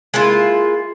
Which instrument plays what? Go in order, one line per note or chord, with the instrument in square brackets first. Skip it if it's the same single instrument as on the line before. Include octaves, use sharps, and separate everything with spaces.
[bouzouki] G#3 A#3 E4 F4